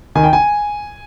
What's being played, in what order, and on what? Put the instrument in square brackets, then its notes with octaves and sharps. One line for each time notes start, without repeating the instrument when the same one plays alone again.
[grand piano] D#3 G#5
G5
G#5